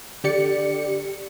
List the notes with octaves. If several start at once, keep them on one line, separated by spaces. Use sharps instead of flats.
D3 G4 D5 C#7